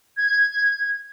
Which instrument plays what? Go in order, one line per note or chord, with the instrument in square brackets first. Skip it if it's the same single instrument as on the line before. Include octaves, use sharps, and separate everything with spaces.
[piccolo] G#6